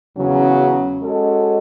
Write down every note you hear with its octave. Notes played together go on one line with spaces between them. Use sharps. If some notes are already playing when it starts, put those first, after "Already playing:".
E2 C#3 F#3 C#4
G#3 C#4 F#4 A4 D#5